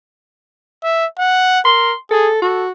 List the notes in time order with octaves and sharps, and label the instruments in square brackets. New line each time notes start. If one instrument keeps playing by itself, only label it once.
[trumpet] E5
F#5
[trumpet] A#4 [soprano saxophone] C6
[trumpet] G#4 [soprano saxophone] A4
[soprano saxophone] F#4 [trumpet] A4